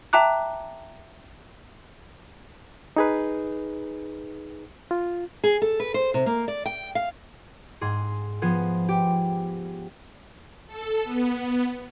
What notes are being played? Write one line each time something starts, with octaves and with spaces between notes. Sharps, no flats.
E5 G5 A5 A#5 D6 F#6
D#4 G#4 B4
F4
G#4
A4
B4
C5
C3
A#3
D5
G5
F5
G#2 G#4 C6
F3 B3 G#4 C5
G4
A4
B3